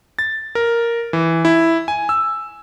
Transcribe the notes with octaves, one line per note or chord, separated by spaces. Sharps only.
A6
A#4
E3
E4
G#5
E6